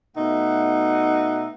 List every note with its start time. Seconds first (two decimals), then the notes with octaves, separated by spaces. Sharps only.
0.17 B2 A3 D#4 E5 F#5